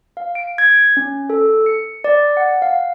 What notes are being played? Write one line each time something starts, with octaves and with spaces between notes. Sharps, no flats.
F5
D7
G#6
C#4
A4
C#7
D5
F#5
F5